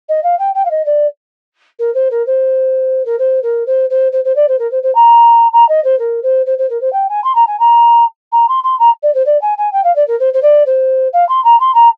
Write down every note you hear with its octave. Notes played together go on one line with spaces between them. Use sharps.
D#5
F5
G5
G5
F5
D#5
D5
A#4
C5
A#4
C5
A#4
C5
A#4
C5
C5
C5
C5
D5
C5
A#4
C5
C5
A#5
A#5
D#5
C5
A#4
C5
C5
C5
A#4
C5
G5
G#5
C6
A#5
G#5
A#5
A#5
C6
C6
A#5
D5
C5
D5
G#5
G#5
G5
F5
D5
A#4
C5
C5
D5
C5
F5
C6
A#5
C6
A#5